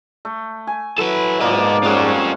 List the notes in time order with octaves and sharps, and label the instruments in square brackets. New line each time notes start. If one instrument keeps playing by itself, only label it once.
[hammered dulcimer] A3
G#5
[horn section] F#3 E4 [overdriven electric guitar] A4 B4
[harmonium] G#2 D5 [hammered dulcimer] F3 A#3 [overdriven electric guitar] B4 D#5
[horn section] G3 C4 C#4 [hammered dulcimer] G#3 C#5 F#5 [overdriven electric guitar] F4 A4